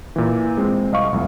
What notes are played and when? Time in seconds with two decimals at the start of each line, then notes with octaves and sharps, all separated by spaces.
0.16 A#2 E3
0.57 G#3 C4
0.92 C2 D#5 F5 C#6
1.12 C2 F2 A3